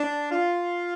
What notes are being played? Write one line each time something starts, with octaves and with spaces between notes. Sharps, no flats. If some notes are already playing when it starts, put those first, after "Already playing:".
Already playing: D4
F4